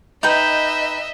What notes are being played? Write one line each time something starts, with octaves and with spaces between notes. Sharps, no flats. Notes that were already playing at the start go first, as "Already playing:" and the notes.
D#4 B4 D#5 E5 G5